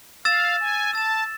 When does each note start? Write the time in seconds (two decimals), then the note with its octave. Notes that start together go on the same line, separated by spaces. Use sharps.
0.25 F5 E6 A6 E7
0.60 G#5
0.93 A5 E6 A6 E7